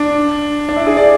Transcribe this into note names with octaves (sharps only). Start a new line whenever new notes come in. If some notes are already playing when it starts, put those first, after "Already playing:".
Already playing: D4
D4
E4
G#4
D5